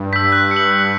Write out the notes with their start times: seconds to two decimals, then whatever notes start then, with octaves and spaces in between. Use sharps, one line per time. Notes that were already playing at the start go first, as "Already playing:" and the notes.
Already playing: G2
0.13 E6 G6 B6
0.32 F#6
0.51 C#7
0.56 F#7
0.72 F#6